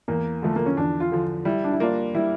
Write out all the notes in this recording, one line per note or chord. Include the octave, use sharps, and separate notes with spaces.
E2 A#3
D3 F3 A3
A#3
C#4
E2 D4
F4
D3 F3
G3 E4
D4
E4
A#3 D4 F4
G3 E4